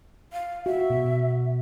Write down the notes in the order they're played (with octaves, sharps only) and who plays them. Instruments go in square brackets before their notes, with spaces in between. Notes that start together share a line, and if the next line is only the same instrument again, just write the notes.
[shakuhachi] F5
[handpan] F#4 [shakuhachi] E5
[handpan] B2